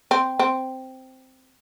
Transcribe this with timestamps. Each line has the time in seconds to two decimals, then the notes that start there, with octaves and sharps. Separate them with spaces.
0.11 C4
0.39 C4